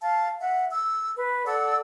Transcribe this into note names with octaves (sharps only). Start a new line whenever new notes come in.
F5 A5
E5 F#5
E6
B4
A4 D5 F#5 E6